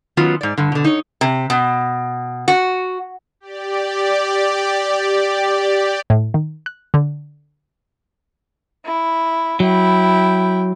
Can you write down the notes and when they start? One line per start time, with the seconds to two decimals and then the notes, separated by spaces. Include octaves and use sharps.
0.17 D#3 F#3 B3 C#4 F4
0.41 G#2 D5
0.58 G2 D3
0.72 B2 D3
0.84 D#4 C#5
1.21 C3
1.50 B2
2.48 F#4
3.40 G4 D5
6.10 A2
6.34 D#3
6.66 F#6
6.94 D3
8.85 E4
9.60 F#3 E4 G5